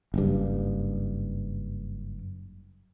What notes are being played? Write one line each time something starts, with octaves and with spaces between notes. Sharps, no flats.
F#1 G2